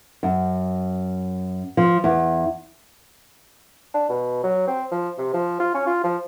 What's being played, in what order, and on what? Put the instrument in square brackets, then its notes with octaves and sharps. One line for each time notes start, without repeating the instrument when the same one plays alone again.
[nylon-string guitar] F#2
F3
E2
[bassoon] D4
B2
F#3
C4
F3
C3
F3
F4
C#4
F4
F3